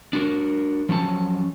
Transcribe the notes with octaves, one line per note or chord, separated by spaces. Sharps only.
D4 F#4 A#4
F3 F#3 C#4 A5